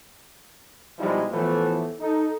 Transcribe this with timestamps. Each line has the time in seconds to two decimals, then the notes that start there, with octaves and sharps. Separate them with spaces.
0.98 B2 F3 G3 G#3 D#4 E4
1.31 A2 E3 F3 A3 B3
2.00 D#4 A4